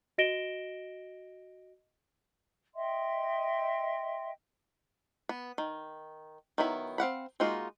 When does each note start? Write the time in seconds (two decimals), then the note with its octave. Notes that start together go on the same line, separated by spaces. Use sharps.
0.18 F#4 D#5 A#6 D7 E7 G7
2.74 D#5 E5 G5 C6
5.29 B3
5.58 D#3
6.58 D#3 F#3 B3 E4 B5
6.98 C4 F5 F#5 B5
7.40 G#3 A#3 D#4 F4 F#4